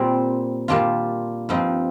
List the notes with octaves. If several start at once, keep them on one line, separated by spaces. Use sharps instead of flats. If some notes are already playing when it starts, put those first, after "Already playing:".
Already playing: A#2 G3 C4
A#2 G3 D4 F4
G2 F3 C4 D#4